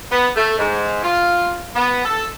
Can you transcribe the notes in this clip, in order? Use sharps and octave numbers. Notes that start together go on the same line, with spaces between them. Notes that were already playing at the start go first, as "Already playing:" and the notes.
B3
A3
G#2
F4
B3
A4